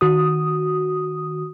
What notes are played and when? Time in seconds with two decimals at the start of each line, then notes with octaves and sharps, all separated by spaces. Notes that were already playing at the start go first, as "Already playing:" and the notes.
0.01 D#3 F#4 D#6